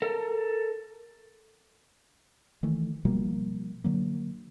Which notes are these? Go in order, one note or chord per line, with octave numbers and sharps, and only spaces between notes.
A4 A#4
D#3 E3 A3
B2 F3 G3 A#3
D3 F#3 A#3